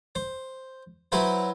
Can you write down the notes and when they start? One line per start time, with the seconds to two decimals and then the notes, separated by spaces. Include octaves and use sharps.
0.15 C5
1.12 F#3 E4 B4 C5